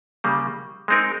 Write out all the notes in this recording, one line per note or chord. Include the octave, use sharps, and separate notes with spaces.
C#3 G3 A#3
G#3 C4 D#4 A#4